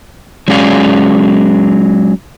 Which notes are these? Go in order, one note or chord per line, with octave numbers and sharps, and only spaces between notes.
F#3 G#3 C#4 G#4 D5 F5